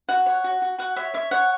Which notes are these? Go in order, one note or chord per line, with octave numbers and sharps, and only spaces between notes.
F#4 F#5
C#5
F#4
F#4
F#4 F#5
C#5 E5
C#5 E5
C#5 F#5